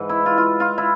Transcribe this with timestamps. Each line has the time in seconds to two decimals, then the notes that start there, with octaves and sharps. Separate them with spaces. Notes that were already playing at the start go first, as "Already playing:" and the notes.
Already playing: G#2 E3
0.09 E4
0.26 F4
0.38 F4
0.60 F4
0.78 E4